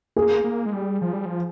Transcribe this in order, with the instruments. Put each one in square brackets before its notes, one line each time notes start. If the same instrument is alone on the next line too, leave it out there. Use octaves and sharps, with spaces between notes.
[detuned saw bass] A#3 [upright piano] G#4
[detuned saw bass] A#3
G#3
G3
F3
G3
F3